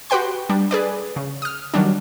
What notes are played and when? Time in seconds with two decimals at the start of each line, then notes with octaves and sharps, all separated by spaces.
0.10 F#4 G4 B4 G5 C6
0.49 G3 D4
0.71 G#4 B4 D5
1.16 C#3
1.42 D#6 F6
1.74 D#3 F#3 G3 D4